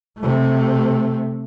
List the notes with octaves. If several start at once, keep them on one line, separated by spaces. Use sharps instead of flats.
C3 A3